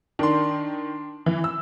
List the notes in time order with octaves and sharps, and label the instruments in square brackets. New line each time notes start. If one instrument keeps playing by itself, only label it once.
[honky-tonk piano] D#3 [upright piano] D4 C6
[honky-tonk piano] E3
E6